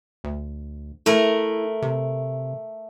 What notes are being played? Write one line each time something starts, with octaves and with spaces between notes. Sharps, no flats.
D2
A3 E4 A#4
C3